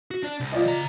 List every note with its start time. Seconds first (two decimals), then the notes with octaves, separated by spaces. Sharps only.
0.11 F#4
0.23 D4 D5
0.40 C2
0.52 F4 D5 D#5
0.66 C#3 A#5